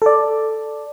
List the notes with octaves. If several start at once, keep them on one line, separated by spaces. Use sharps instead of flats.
A4 D5